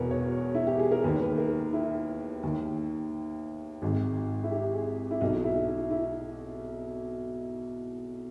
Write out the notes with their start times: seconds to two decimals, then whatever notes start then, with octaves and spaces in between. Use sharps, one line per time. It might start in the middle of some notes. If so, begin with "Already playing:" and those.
Already playing: E1 E2 B2 A#4 B4
0.11 C#5
0.55 E4
0.67 G4
0.79 G#4
0.91 A#4
1.04 D#2 D#3 B4
1.21 B4
1.38 A#4
1.73 E4
2.43 D#2 D#3
3.82 G#1 G#2 D#3
4.44 E4
4.51 G4
4.74 G#4
5.11 E4
5.21 B1 B2 D#4
5.44 E4
5.67 E4
5.91 E4